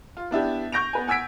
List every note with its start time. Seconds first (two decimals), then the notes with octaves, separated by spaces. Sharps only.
0.17 F4
0.31 B3 D4 E4 G4
0.72 C#6 G6 A#6 D7 F7
0.93 B3 B4 G#5
1.07 F#5 G#5 E6 G#6 B6 D7